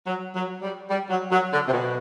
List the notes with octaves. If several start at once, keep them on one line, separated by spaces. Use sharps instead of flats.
F#3
F#3
G3
G3
F#3
F#3
D3
C3
B2